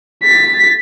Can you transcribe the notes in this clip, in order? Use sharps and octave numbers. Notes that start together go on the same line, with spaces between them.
A6 B6